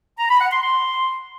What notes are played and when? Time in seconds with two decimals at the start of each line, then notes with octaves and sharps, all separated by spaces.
0.18 A#5
0.29 B5
0.41 F#5
0.52 C6
0.63 C6